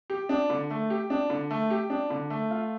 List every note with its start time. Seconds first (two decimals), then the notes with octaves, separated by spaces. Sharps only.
0.10 G4
0.29 D4
0.50 D3
0.70 A3
0.90 G4
1.10 D4
1.30 D3
1.51 A3
1.70 G4
1.90 D4
2.10 D3
2.30 A3
2.51 F4